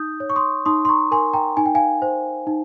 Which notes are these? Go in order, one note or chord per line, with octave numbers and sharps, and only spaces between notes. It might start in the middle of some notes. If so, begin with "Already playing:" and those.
Already playing: D#4 D#6 G6
C#5
C#6
C6 D#6
D#4 C6 D#6
C6
A#5 C#6
A#4 G#5 C6
G5 A#5
D#4 G#5
G5
F5 G#5
C5
D#4